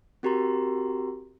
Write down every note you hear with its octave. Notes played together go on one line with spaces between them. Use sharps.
C4 F#4 G4 A#4 A#5 C6